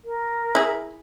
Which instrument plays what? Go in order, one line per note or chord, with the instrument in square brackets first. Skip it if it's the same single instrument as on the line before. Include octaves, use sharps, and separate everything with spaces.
[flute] A#4
[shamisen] E4 G#4